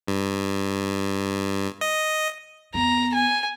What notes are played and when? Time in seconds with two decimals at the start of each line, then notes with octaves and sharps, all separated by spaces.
0.07 G2
1.81 D#5
2.74 F2 B3 A#5
3.15 G#5